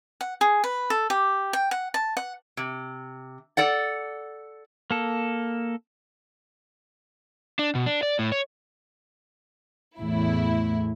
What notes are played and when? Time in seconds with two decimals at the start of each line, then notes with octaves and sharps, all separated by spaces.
0.21 F#5
0.41 G#4
0.64 B4
0.90 A4
1.10 G4
1.53 G5
1.71 F#5
1.94 A5
2.17 F#5
2.57 C3
3.57 A4 D5 F#5
4.91 A#3 A4
7.59 D4
7.75 B2
7.86 D4
8.03 D5
8.19 A2
8.32 C#5
9.99 E2 A2 E4